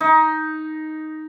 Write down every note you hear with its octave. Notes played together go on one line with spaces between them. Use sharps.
D#4